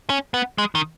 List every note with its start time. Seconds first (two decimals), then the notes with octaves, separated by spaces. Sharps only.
0.10 C#4
0.34 B3
0.58 G#3
0.75 D#3